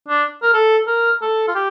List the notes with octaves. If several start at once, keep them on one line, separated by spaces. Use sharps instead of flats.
D4
A#4
A4
A#4
A4
F4
G4